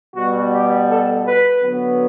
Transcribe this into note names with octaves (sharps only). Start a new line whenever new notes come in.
B2 G3 B3 F#4
G4
A4
B4
D3 F#3 B3